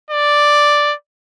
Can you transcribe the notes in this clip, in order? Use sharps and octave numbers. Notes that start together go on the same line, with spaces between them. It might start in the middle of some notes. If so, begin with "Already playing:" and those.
D5